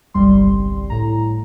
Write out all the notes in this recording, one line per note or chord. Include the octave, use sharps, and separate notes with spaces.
G1 C2 G3 C6
A2 A#5